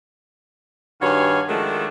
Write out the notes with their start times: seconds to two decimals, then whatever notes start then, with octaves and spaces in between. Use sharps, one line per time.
1.02 G2 D#3 F#4 C#5 F5 G#5
1.48 D#3 F3 G#3 A3 D4 F#4